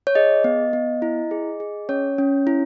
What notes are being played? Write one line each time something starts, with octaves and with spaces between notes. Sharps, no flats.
C#5
G#4 D#5
B3
B3
E4
G#4
G#4
C#4 C#5
C#4
E4